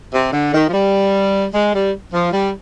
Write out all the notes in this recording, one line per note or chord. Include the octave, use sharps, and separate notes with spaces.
C3
D3
D#3
F3
G3
G#3
G3
F3
G3